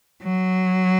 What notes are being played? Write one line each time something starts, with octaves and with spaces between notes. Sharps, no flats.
F#3